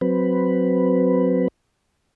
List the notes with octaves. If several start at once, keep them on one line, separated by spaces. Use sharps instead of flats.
F#3 C4 B4